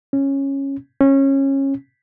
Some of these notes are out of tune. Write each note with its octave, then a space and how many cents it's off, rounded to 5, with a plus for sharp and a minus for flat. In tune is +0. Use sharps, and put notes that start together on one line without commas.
C#4 -10
C#4 -20